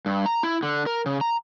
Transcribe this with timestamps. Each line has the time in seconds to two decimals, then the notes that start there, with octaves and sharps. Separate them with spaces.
0.06 G2
0.26 A#5
0.43 E4
0.63 D3
0.86 A#4
1.06 C#3
1.21 A#5